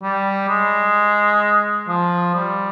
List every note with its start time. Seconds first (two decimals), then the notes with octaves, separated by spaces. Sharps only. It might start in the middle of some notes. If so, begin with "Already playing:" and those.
0.03 G3
0.48 G#3
1.88 F3
2.35 G3